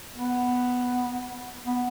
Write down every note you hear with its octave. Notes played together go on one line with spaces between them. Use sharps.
B3
B3